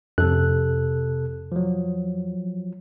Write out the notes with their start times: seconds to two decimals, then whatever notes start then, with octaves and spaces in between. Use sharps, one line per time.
0.18 F2 C3 A4 F#6
1.52 F3 F#3